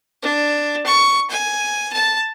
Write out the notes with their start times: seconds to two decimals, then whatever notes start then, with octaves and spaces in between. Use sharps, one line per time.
0.22 D4
0.86 C#6
1.30 G#5
1.93 A5